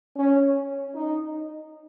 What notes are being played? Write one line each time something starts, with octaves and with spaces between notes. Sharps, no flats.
C#4
D#4